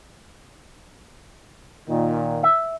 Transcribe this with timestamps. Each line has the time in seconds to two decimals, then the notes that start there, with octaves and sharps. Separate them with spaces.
1.89 A#2 D#3
2.43 E5